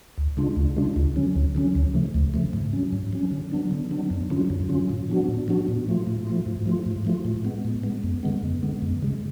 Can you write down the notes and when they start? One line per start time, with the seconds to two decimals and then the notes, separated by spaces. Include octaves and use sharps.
0.18 D2
0.37 C#3 G#3 D4 F4
0.56 D2
0.76 C#3 G#3 D4 F4
0.96 D2
1.16 D3 F#3 C#4
1.36 D2
1.55 D3 F#3 C#4
1.75 D2
1.94 C#3 F3 A3
2.14 D2
2.34 C#3 F3 A3
2.53 G#2
2.73 F#3 C#4
2.92 G#2
3.13 F#3 C#4
3.31 D3
3.52 F#3 B3 D4
3.71 D3
3.91 F#3 B3 D4
4.10 F#2
4.30 D3 F#3 C#4 F4
4.50 F#2
4.69 D3 F#3 C#4 F4
4.89 A2
5.09 F3 B3 D4 F#4
5.28 A2
5.48 F3 B3 D4 F#4
5.68 A2
5.87 F3 A3 F4
6.07 A2
6.27 F3 A3 F4
6.46 G#2
6.66 F3 A3 F4
6.86 G#2
7.05 F3 A3 F4
7.25 A2
7.45 G#3 B3
7.65 A2
7.83 G#3 B3
8.04 F#2
8.23 D3 G#3 B3
8.43 F#2
8.63 D3 G#3 B3
8.82 F#2
9.02 C#3 G#3